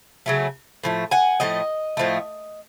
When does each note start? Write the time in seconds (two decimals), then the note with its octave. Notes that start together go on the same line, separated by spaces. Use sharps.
0.26 C#3 F#3 A3
0.83 A2 F3 A3
1.11 F#5 G#5
1.40 A2 F3 A3 D#5
1.97 A2 F3 A3